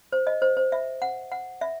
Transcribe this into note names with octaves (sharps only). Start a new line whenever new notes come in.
C5
D#5
C5
C5
E5
F#5
F#5
E5